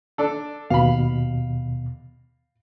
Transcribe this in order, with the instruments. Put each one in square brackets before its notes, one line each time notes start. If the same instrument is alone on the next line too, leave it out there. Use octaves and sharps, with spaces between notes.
[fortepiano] D4 A4
[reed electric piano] D#2 B2 [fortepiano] F5 B5